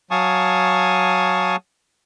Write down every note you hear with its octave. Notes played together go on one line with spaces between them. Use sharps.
F#3 F5 G#5 A5 C#6 D#6